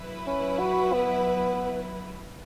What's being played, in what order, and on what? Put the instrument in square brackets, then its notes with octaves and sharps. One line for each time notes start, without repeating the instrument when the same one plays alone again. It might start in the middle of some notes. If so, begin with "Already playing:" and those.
Already playing: [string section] F#3 E4 B4
[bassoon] C#4
F#4
B3